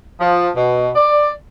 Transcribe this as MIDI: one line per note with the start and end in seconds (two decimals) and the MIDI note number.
0.19 0.49 53
0.55 0.89 47
0.95 1.30 74